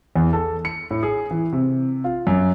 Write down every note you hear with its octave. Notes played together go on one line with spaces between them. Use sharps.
E2
A4
C#7
A2
G#4
E3
C3
F4
F#2